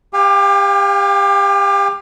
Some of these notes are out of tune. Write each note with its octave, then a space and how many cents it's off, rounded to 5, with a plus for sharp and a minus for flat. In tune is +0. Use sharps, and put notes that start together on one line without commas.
G4 +25 F5 +15 G#5 -40